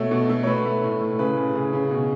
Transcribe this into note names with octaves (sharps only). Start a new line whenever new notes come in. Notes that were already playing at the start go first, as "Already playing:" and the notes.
Already playing: B2 A3 C#5
B2
A3
C#5
A3 B4
A3
A2
A2
C#3 B4
C#3
C#3 G#4
C#3
B2